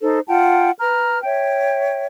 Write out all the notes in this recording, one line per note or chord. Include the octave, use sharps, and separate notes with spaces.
D#4 A4 C5
F4 F#5 G5 A5
B4 A#5 F6
C#5 E5 G5